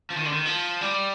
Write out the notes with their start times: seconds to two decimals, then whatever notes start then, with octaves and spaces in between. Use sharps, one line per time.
0.10 F3
0.17 D#3
0.25 D3
0.32 D#3
0.45 F3
0.81 G3